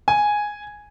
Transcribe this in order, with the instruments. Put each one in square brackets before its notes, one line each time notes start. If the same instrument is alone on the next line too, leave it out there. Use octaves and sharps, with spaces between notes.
[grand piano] G#5